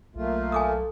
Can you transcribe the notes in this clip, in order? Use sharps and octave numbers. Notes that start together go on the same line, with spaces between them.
B1 A3 A#3 F4
A4 G#5 D6 D#6